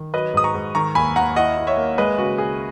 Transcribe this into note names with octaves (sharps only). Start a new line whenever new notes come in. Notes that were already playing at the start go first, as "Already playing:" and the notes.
Already playing: D#3
F#3 B4 D#5
G#2 D#6
A#5 C#6
G#2
D#3 A#5 C#6
D#2 G#5 B5
D#2 F#5 A#5
E4 D#5 F#5
E4
C#5 E5
A#3
G#3 B4 D#5
C#3 F#4
C#2 G#4